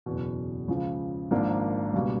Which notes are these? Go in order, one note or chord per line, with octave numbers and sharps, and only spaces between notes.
F#1 E2 B2
C#2 C#3 F3
G#1 G#2 F3 A#3 D4
C#2 B2 G3 A#3